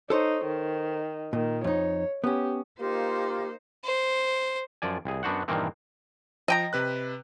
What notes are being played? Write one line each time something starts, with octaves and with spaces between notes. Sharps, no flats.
D#4 A4 C5 C#5
D#3
A#2 D#3
F2 D#4 C#5
B3 C#4 G4
A#3 D#4 F4 G4 C5
C5
F#2 F3 D5 G#5
C2 G#4
F#2 B3 D4 F#4 C5 F#5
G2 A#2 D#3 E3 A#3 C4
F3 D#5 G5 A#5
C3 B4 F#6